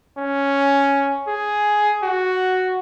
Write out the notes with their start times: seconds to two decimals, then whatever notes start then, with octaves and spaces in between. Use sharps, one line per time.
0.18 C#4
1.28 G#4
2.03 F#4